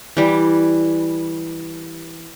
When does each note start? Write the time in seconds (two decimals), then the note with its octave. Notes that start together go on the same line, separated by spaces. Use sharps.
0.17 E3 G3